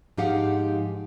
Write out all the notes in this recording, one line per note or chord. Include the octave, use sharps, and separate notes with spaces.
G#2 F3 D#4 G4 F5 F#5